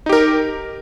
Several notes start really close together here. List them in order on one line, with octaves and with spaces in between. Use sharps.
D#4 G4 A#4